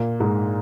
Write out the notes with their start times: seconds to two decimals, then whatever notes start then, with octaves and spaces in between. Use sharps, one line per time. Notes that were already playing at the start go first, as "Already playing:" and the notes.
Already playing: A#2 A#3
0.20 G#2 G#3